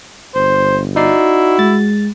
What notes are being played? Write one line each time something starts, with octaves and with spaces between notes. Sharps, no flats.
G1 C5
D#4 E4 F#4 D5 C7
G#3 A6